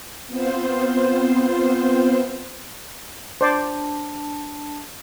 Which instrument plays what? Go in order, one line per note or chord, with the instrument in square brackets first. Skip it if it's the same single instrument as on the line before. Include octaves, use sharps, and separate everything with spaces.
[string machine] B3 C4 F4 C5
[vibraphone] D4 A5 [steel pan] C5 D5